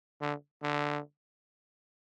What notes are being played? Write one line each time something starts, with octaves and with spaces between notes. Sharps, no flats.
D3
D3